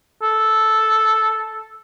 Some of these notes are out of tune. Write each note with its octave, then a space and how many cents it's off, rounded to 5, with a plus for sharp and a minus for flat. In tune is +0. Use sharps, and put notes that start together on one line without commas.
A4 -5